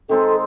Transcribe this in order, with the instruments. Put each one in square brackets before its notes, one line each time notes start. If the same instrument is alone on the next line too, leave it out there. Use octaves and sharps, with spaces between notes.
[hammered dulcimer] D#3 G#3 C4 D#4 [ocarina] A4